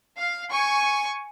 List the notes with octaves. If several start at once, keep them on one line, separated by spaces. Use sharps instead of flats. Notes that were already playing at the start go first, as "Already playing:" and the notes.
F5
G#5 C#6